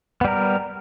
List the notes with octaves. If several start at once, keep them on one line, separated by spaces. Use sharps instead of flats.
G3 B3 A#4